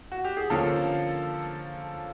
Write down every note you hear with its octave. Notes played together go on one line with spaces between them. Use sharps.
F#4
G4
G#4
D3 F3 A#3 C#4 A4